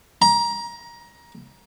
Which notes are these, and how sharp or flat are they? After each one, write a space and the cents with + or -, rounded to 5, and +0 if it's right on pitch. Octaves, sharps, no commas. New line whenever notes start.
A#5 +20